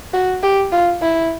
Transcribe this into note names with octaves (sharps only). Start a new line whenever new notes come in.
F#4
G4
F4
E4